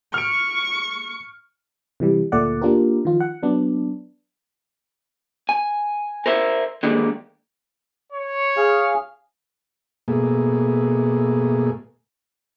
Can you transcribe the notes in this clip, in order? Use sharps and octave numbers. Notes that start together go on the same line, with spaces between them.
C#6 F6 D7
C3 E3 G3
D2 A#2 A3 D5 F#5
A#3 D4 F4 G4 A#4
D#3 F3 F4
F#5
F#3 B3 D4
G#5
A#4 C5 E5
D3 D#3 G3 G#3 A#3
C#5
G#4 F5 F6
B2 A3 A#3 G#4